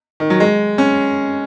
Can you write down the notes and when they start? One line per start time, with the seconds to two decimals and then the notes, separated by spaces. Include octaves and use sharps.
0.20 D#3
0.30 F#3
0.40 G#3
0.78 C#4